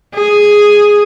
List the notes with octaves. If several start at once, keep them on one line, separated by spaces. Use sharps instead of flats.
G#4